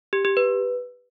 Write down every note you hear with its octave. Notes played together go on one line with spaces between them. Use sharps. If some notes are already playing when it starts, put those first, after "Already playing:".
G4
G4
B4